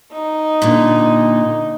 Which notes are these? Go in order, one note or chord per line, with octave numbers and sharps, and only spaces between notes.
D#4
A#2 D3